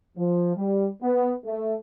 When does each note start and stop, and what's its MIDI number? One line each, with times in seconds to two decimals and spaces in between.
0.18 0.55 53
0.57 0.88 55
1.03 1.32 59
1.45 1.75 57